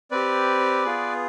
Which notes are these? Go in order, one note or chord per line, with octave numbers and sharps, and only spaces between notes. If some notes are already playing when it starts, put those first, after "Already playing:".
C4 G4 B4 D5
B3 F4 G#4